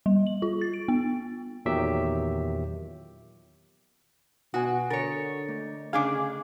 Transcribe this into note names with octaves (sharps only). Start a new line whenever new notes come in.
G3
F#7
F4
A6
D7
B3
E2 A#2 D#3 F#3 G4 E5
B2 F#4 F#5 G#5 D#6
D3 A#4 C#5 A6 C#7
A3
C#3 D4 G#4 F5 G#5 D6